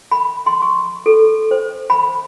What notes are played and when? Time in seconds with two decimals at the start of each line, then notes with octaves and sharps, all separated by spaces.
0.12 B5
0.46 C6
0.62 C#6
1.06 A4
1.51 C5
1.90 B5